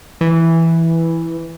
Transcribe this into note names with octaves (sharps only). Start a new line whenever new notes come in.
E3